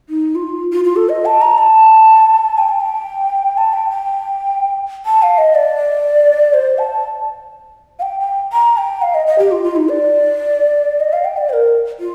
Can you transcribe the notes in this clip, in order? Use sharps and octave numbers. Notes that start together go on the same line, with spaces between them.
D#4
F4
F4
F4
A4
D#5
A5
A#5
A5
G5
A5
G5
A5
G5
G5
A5
F5
D#5
D5
C5
A5
F5
G5
G5
A#5
G5
F5
D#5
D#5
G4
F4
F4
D#4
D5
D#5
F5
G5
D5
C5
A#4
F4